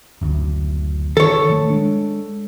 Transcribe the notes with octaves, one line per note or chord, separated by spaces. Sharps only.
F#1 D2
D#3 A4 C#5
D#3 A3
G#3 D4